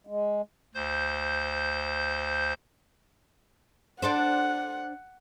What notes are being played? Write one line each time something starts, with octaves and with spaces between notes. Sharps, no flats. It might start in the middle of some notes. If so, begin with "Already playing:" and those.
G#3
D2 C5 G6
D4 A4 C5 F#5